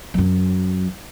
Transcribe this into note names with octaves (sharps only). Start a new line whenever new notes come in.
F#2 F#3